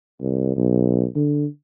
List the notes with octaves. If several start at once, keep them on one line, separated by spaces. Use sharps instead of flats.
C2
B1
D3